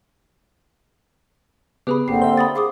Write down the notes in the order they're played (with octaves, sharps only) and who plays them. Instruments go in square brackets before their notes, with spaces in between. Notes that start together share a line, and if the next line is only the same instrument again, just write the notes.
[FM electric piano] C#3 B3 [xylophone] G4 G#4 B5
[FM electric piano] G#1 [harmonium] D3 C4 [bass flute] A#3 [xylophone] G4 C7
[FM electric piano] C5 E5
[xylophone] B5 D#6 A6
[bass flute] G#4 [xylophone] F5 D6 D#6